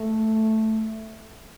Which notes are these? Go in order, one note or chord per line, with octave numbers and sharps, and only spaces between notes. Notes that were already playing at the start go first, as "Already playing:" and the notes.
Already playing: A3